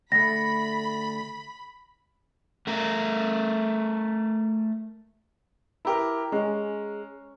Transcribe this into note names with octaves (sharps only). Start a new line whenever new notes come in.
D2 A3 B5 A#6
A3 A#4
E4 G4 A#4 A#5
G#3 C#4 C#5